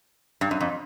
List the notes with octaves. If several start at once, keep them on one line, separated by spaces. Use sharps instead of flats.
G2
F#2
F2